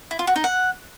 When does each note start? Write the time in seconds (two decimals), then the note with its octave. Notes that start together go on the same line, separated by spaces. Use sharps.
0.11 E4
0.19 F4
0.27 F#4
0.36 D#4
0.44 F#5